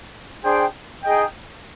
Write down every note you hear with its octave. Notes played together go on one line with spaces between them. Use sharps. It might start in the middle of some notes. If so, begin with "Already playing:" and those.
D4 G#4 C5 G5
D#4 G#4 D#5 G5